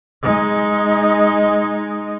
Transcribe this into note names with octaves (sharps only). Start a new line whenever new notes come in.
G#3 D#4